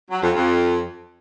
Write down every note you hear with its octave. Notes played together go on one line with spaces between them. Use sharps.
F#3
F2
F2